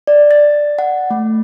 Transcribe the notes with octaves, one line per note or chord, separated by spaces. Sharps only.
D5
A6
F#5
A3